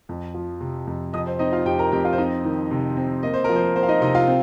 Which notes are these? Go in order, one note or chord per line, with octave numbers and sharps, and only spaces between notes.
F2
F3
C3
F2
F2 D#5 D#6
C5
C4 D#4 D#5
F4 F5
F2 G4 G5
A#4 A#5
F2 G4 G5
F4 F5
C5
C4 D#4 D#5
D#3
C3
C4
A#3 D#5
C5
F3 A#4
C5
A#3 C5
F5
D#4 D#5
C3 D#4 D#5
F4 F5
C4